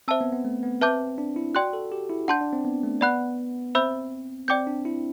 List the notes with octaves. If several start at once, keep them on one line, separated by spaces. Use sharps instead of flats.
C4 C5 E5 A5 E6
B3
B3
A3
B3
C4 B4 E5 A5 D6 G6
D4
E4
F#4 D5 G5 C6 F#6
A4
G4
E4
D4 F#5 A5 C6 G6
D4
C4
B3
A3
B3 D5 F#5 B5 F#6
C4 C5 E5 B5 E6 G6
C4 D5 G5 D6 G6
D4
E4